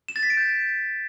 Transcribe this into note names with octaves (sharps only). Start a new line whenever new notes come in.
E7
A6
B6
D7
G6